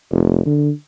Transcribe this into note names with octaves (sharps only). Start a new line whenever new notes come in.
F1
D3